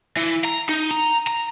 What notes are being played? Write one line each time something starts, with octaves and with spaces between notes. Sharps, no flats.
E3
A#5
D#4
A#5
A#5